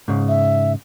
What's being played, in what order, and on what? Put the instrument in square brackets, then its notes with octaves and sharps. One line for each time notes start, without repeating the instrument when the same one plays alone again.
[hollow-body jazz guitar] G#2 C#3
[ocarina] E5